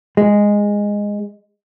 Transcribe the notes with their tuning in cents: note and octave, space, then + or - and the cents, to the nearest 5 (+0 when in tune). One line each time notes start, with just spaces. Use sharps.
G#3 -10